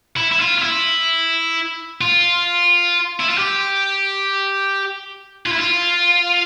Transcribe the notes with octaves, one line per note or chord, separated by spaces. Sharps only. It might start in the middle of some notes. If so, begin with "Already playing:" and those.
E4
E4
F4
F4
E4
F4
E4
F4
G4
F4
E4
F4